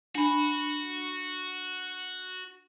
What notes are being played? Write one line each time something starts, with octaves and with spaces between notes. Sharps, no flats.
D4 F#4 B5